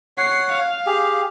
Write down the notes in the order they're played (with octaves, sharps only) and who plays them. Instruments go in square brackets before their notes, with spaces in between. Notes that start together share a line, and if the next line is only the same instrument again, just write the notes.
[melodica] C#5 F#5 [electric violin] C7
[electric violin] F5
[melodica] G4 G#4